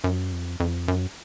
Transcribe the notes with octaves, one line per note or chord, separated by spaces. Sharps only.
F#2
F2
F2
F#2